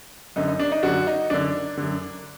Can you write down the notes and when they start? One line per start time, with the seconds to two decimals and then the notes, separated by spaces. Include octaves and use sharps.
0.36 F#2 D3 D#4
0.48 D#4
0.60 D4
0.72 D#4
0.83 F#2 D3 D4 F#4
1.07 D#4
1.30 F#2 D3 D4
1.77 D3
1.82 F#2